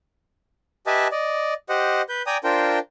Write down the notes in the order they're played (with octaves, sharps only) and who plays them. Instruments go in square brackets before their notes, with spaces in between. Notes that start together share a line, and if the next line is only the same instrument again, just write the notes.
[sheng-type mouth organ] G4 B4 D#5 E5 G#5 A5
D5 D#5
G4 C5 D#5 F#5
B4 G6
D5 G5 G#5 A#5 D#6
D4 F4 A#4 C5 G5